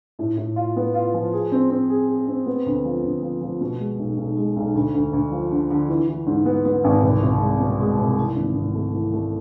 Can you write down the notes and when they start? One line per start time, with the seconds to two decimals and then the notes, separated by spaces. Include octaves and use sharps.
0.19 A2
0.37 A2
0.56 F4
0.76 B3
0.94 F4
1.14 F3
1.33 G#4
1.52 C4
1.70 C4
1.89 G#4
2.09 G#4
2.28 C4
2.46 B3
2.66 D2
2.85 F3
3.04 D2
3.22 F3
3.41 F3
3.61 B2
3.79 G#3
3.99 B1
4.18 B1
4.37 G#3
4.56 B1
4.75 D2
4.94 D2
5.13 D2
5.31 F3
5.51 D3
5.70 D3
5.88 E3
6.08 E3
6.27 G#2
6.46 B3
6.65 B3
6.84 G#1
7.03 C2
7.22 C2
7.40 G#3
7.60 B2
7.79 G#3
7.98 C2
8.17 E3
8.36 G#1
8.56 G#1
8.74 A3
8.93 E3
9.12 A3